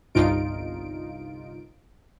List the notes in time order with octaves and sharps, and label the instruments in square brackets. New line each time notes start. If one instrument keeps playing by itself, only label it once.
[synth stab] G1 C2 G2 D#4 F4 D7